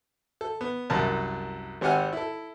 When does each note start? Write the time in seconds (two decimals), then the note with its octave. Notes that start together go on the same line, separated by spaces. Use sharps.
0.41 A4
0.61 B3
0.90 C2 F#2 A#4 A5
1.81 G#1 C4 G4 F#5 G#5 F6
2.13 E4 A4